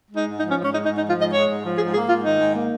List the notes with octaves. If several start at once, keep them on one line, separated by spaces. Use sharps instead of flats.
G#3
D#4
G#2
F3 D#4
C#4
G#2
C#4
G#3 D#4
G#2 D#4
D#4
F3
F4
G#2 D#5
G#3 C#5
G#2
F3
G#2 G#4
A#3 G#4
G#2 F4
D#3 D#4
G#2
A#3